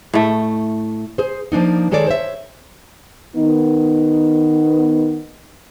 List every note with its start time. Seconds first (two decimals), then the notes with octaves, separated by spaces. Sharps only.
0.13 A2 A3
1.18 G#4 C5
1.52 F3 A#3 D4 D#4
1.91 D#3 G#3 G#4 A4 C#5 D5
2.07 C5 C#5 E5
3.36 D#3 B3 D#4